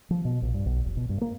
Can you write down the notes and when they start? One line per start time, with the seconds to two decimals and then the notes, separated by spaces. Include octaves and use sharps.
0.10 F3
0.25 B2
0.42 A#1
0.54 G2
0.66 B1
0.85 F1
0.97 B2
1.09 G2
1.21 A#3